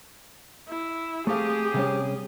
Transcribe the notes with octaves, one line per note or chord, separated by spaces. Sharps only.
E4
A3 C4 G4 G#4 F5
C3 G3 C#4